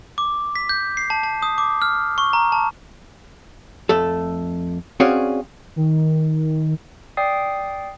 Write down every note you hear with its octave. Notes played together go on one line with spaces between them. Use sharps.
D6
B6
G6
C7
A5
A5
D#6
D6
F6
C#6
A#5
A5
F2 A3 A4
C4 C#4 F#4 G#4 D5 F5
D#3
D5 G5 D#6 C7